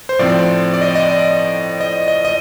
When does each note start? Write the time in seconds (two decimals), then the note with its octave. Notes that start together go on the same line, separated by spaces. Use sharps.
0.09 C5
0.19 A2 F3 C4 D5
0.74 D5
0.81 D#5
0.88 D5
0.95 D#5
1.01 D5
1.81 D#5
2.08 D#5
2.25 D#5